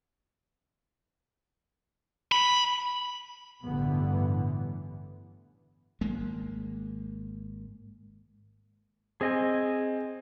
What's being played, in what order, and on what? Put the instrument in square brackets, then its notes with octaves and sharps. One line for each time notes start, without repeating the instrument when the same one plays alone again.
[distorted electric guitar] B5
[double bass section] A1 G2 D3 E3 B3
[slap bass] G#1 G#3 A#3
[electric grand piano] C4 [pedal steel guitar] G#4 D#5 G#5